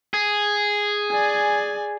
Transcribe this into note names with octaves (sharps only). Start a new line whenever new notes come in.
G#4
D5 G#5